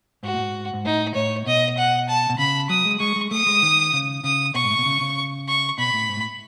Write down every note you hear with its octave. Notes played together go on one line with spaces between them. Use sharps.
G#2 F#4
A2
G#2
G#2
A2 D#4
A2 C#5
B2 D#5
F#5
A5
B2
C#3 B5
F#3 D#6
G#3
G#3 C#6
G#3
A3 D#6
G#3
D#3
C#3
C#3 D#6
B2 C#6
G#2
A2
B2
C#3
C#3
C#6
B2 B5
A2
G#2
A2